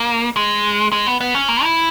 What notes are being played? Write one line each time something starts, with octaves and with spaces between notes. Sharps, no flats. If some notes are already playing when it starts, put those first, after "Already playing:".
Already playing: A#3
G#3
G#3
B3
B3
C#4
A#3
E4